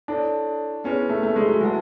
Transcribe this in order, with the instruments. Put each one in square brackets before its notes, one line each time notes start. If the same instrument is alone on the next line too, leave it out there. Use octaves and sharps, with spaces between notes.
[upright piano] D4 [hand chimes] E4 A4 C#5
[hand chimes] B3 E4 G#4 B4 [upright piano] C#4
[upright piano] A3
A3
G#3
F#3
[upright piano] G#3 [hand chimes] E4 B4 F#5 A5